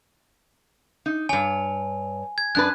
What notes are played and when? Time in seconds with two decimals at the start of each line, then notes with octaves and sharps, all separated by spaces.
1.06 D#4
1.29 G2 C#5 G#5
2.38 G#6
2.55 F#2 D4 B4 F#6